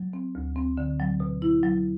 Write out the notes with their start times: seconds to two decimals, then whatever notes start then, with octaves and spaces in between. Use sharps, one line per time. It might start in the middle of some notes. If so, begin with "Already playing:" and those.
Already playing: F#3
0.13 C4
0.35 D2
0.56 C4
0.77 D3
1.00 F#3
1.20 B2
1.42 E4
1.63 F#3